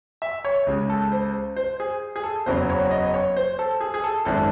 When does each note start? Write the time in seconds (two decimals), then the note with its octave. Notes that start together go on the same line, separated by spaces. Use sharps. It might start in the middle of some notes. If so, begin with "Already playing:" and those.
0.22 E5
0.45 C#5
0.67 C#2 C#3 G#3
0.90 A4
1.12 C5
1.56 C5
1.80 G#4
2.16 G#4
2.24 A4
2.46 F#1 E2 C#3 F#3 C5
2.69 C#5
2.91 D#5
3.14 C#5
3.36 C5
3.59 A4
3.81 G#4
3.94 G#4
4.04 A4
4.25 G#1 F#2 D#3 G#3 A4